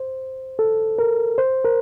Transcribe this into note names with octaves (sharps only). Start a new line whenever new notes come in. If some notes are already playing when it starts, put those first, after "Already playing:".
Already playing: C5
A4
A#4
C5
A#4